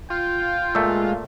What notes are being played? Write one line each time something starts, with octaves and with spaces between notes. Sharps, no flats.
F4 G5
A#2 G#3 A3 E6